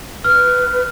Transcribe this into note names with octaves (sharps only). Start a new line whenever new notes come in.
B4 F6